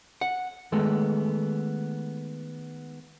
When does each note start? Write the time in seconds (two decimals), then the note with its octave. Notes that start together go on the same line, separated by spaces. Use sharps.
0.21 F#5
0.72 D#3 G#3 A3 B3